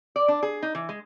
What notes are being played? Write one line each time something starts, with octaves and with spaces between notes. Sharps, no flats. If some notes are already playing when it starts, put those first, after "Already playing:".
D5
D4
G#4
D#4
E3
G#3